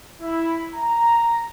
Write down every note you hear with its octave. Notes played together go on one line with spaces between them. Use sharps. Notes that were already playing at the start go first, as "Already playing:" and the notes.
E4
A#5